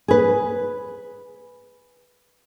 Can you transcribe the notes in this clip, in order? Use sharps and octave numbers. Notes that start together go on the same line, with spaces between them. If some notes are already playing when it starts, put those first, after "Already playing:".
G#4 B4